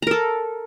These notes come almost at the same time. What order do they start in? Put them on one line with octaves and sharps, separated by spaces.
A#5 A#4 A4